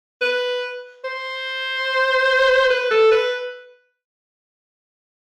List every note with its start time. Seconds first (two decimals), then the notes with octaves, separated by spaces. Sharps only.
0.21 B4
1.04 C5
2.70 B4
2.91 A4
3.11 B4